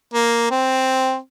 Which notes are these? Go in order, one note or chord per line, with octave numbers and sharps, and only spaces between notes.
A#3
C4